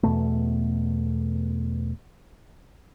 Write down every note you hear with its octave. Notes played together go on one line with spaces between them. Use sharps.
E2 B2 A3